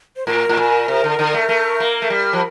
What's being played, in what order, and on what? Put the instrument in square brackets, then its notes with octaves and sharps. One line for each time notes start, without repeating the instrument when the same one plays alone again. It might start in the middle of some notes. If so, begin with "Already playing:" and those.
[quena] C5
[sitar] A2 [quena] A#4
[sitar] A2
A#2
C3
D3
D3
A3
A3
A#3
A3
G3
F3